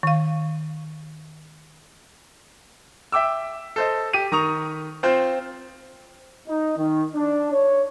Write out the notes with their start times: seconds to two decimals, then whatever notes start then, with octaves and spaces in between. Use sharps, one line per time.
0.03 D#3 F5
3.12 E5 G5 D6 E6
3.76 A4 C5 D#5
4.13 G4 D#7
4.32 D#3 A#5 C#6 D#6 F7
5.03 C4 F4 C5
6.48 D#4
6.78 D#3
7.15 D4
7.52 C#5